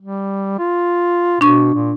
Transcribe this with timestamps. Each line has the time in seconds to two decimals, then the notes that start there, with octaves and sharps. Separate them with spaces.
0.01 G3
0.59 F4
1.41 B2 D4 C#6
1.75 A#2